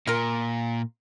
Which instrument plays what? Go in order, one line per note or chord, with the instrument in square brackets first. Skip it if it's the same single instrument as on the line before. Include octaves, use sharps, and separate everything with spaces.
[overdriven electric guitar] A#2 [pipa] F4 A#4